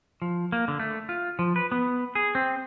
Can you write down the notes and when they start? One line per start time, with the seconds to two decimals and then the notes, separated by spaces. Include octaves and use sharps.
0.22 F3
0.52 A#3
0.68 D3
0.80 A3
1.09 F4
1.39 F3
1.56 B4
1.72 B3
2.15 G#4
2.35 C4